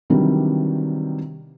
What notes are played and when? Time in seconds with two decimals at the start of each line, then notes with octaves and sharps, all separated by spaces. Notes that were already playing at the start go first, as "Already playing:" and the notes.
0.10 C3 D#3 E3 F#3 G3 D4